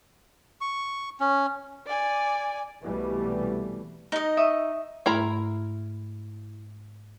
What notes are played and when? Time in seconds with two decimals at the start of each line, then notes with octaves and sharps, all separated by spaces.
0.61 C#6
1.20 C#4
1.87 D5 G#5
2.83 C2 B2 E3 G3 A3
4.12 D#4 D#5
4.37 E5 C#6 D#6
5.06 G#2 A3 E4 A#4 A#5